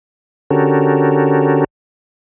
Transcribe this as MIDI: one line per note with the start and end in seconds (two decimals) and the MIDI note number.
0.50 1.64 50
0.50 1.64 61
0.50 1.64 66
0.50 1.64 67
0.50 1.64 69
0.50 1.64 70